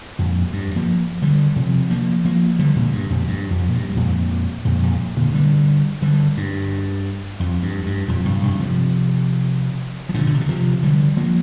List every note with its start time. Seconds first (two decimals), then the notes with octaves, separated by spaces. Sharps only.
0.19 F2 A#2
0.53 G2
0.76 F3 A#3
1.22 D3 G3
1.56 C3 F3
1.90 F3 A#3
2.25 F3 A#3
2.59 D3 G3
2.76 A#2 D3
2.93 G2
3.10 F2 A#2
3.28 G2
3.50 F2
3.68 A#2
3.74 G2
3.89 G2
3.97 F2 A#2
4.65 F2 A#2
4.82 F2 A#2
5.17 A#2 D3
5.33 D3 G3
6.02 D3 G3
6.37 G2
7.40 F2
7.63 G2
7.86 G2
8.08 F2 A#2
8.25 G2 C3
8.43 G2 C3
8.60 C3 F3
10.09 F3
10.14 A#2 D3
10.27 A#2
10.34 C3
10.41 D3
10.48 C3 F3
10.83 D3 G3
11.17 F3 A#3